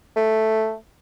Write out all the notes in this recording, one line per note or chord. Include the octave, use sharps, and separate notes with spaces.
A3